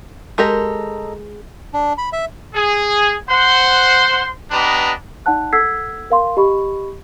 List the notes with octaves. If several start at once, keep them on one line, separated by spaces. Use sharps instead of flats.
G#3 G4 A4 A#4 D#5 A#5
D4
B5
E5
G#4
C5 F#5 C6
B3 D4 G4 B4 D#5 A#5
D#4 D5 F#5 A5 F#6
A4 F#5 E6 G#6 B6 C7
A#4 F5 C6
G4 D#5 B5 C#6